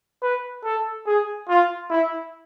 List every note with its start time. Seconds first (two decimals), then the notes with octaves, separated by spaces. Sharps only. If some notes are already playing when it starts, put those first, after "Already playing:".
0.22 B4
0.64 A4
1.06 G#4
1.49 F4
1.90 E4